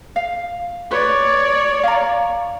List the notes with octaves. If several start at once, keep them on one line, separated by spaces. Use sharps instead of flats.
F5
B4 C#5 D5
F5 A#5